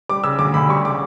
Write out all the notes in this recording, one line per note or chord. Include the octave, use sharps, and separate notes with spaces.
G3 D6
C#3 E6
D2 D6
D2 B5
G3 C#6
C#3 D6